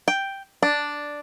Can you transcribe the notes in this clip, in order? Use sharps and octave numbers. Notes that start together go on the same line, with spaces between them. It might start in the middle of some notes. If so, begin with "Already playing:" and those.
G5
D4